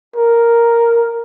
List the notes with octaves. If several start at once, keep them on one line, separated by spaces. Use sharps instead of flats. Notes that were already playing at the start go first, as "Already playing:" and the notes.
A#4